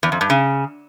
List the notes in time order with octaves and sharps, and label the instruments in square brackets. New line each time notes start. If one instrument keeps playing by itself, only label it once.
[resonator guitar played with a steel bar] E2
F2
G2
C#3